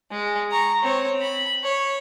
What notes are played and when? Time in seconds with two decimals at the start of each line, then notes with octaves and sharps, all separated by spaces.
0.12 G#3
0.52 A#5 C#6
0.83 C4 C#5
1.22 B5
1.64 C#5